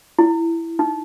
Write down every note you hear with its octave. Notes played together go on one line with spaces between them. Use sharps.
E4
D#4